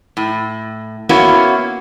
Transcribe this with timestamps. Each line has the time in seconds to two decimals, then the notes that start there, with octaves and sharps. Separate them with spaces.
0.17 A2
1.09 A#3 B3 C#4 E4 F#4